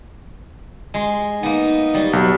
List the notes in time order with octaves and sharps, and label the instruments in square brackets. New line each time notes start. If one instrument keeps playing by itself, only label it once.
[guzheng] G#3 C6
[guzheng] A#3 B3 [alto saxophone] D#4
[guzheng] F#3 G3
[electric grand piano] B1